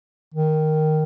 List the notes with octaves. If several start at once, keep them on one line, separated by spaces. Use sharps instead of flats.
D#3